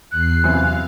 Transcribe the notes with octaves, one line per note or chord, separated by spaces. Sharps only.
E2 F#6 C7
F#2 C3 E3 F5